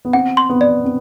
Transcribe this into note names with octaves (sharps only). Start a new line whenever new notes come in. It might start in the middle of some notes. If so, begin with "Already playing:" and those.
B3
C4 F#5
C6
B3
D5
C4